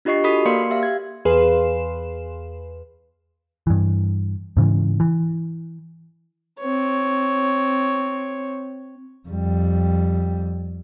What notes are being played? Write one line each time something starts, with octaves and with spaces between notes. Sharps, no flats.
D4 F4 G4 D#5 C#6 C7
F#4 A4 B5 D#6 B6
A#3 A#4 D5 F5 C6 C#7
G4 E5 F5
G#6
E2 G#4 B4 F5 C6 E7
G2 E3
G#2 C#3 E3
E3
C4 C#5
F2 G3